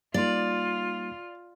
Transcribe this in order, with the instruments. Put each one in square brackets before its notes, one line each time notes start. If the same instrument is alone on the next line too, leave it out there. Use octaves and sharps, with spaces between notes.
[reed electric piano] G3 A#3 D#4 [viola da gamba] F4 [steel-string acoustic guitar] D5